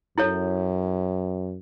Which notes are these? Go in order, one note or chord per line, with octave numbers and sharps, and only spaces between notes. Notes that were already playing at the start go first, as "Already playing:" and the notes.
F#2 E4 A4 C#5